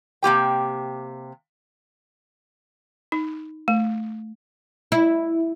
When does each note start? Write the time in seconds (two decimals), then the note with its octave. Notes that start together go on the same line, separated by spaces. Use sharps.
0.23 C3 A#3 G4 G5
3.12 D#4
3.68 A3
4.92 E4